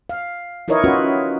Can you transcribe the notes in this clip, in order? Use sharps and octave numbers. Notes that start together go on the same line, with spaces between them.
F5
D#4 E4 A#4 B4 C#5 D#5
C#4 F4 F#4 B4